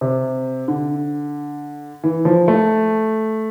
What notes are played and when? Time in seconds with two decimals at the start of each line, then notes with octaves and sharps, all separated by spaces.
0.01 C3
0.68 D3
2.04 E3
2.25 F3
2.48 A3